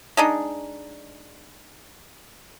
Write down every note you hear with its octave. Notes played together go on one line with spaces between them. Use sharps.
G#3 D4 D#4